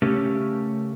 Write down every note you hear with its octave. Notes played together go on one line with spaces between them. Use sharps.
C#3 A3 C#4 G4 A#4